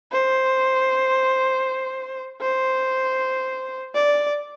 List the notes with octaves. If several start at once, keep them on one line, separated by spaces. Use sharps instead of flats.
C5
C5
D5